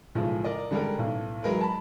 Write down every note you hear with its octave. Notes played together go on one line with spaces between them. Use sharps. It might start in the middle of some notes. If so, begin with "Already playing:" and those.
B1 A2 C#3 F3 G#3
A#4 D5 D#5
D3 G3 G#3 C#4 A#4
B1 A2
F#3 G#3 A#4 B4
A5 B5